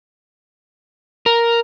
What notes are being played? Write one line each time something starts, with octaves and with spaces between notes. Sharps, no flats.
A#4